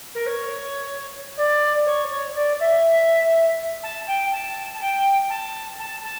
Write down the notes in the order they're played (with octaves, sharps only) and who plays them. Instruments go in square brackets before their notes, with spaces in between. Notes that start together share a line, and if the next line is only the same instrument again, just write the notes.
[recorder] A#4
C#5
D5
C#5
C#5
D5
E5
A5
G5
A5
A5
G5
A5
A5
A5